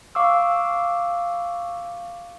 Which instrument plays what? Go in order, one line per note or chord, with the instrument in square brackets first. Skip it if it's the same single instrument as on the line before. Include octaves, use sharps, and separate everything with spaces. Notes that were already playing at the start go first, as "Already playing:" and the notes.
[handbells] F5 C#6 D6 E6